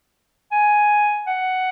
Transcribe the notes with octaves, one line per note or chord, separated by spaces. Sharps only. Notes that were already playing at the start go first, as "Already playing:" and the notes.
G#5
F#5